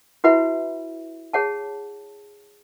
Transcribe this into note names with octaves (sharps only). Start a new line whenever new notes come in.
E4 F#4 B4 E5 F#5 B5
G#4 C#5 F#5 A5